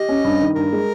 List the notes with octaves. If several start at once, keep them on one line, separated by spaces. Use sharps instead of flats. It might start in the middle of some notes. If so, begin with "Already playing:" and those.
Already playing: G4 D#5
C#4
G2
D#3
G2 A#4
G#3